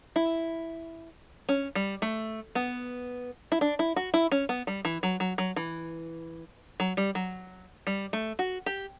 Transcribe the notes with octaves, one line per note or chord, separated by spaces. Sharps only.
E4
C#4
G3
A3
B3
E4
D4
E4
F#4
E4
C#4
B3
G3
E3
F#3
F#3
F#3
E3
F#3
G3
F#3
G3
A3
F#4
G4